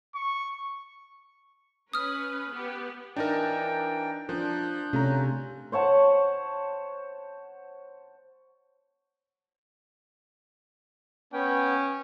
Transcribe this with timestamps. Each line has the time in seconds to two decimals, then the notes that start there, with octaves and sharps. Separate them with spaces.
0.15 C#6
1.93 C#4 B4 B5 D#6 F6
2.52 B3 G4 B4
3.16 E3 D4 D#4 A#4 G5
4.29 F3 D4 A#4 F#6 G6
4.93 C3 A3 C#4 F4 A#5
5.72 C5 C#5 F#5 A5
11.33 B3 C#4 G5